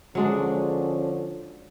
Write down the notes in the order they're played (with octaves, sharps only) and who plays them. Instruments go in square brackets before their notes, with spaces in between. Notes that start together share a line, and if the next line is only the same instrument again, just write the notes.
[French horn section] D3 F3 C#4 [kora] F#3 G#3 D4